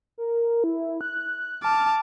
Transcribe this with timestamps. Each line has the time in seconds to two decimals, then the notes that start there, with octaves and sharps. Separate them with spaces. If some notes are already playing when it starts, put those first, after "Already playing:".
0.18 A#4
0.64 E4
1.01 F#6
1.63 A5 D6 F6